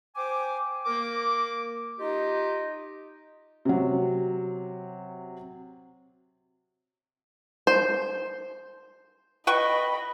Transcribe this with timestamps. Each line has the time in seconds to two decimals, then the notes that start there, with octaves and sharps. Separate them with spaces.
0.16 C5 G5 G#5 D6
0.85 A#3 A#4 D6
1.99 D#4 F4 G4 D#5
3.65 C3 F#3
7.67 C5
9.47 B4 D#5 G5 B5 C#6